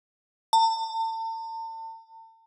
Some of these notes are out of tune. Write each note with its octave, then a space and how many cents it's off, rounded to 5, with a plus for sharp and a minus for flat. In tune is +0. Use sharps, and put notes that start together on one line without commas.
A5 +40